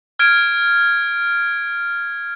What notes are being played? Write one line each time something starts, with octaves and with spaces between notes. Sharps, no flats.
F6 G#6 D7